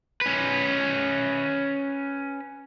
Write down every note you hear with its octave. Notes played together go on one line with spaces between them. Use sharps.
C#4 B4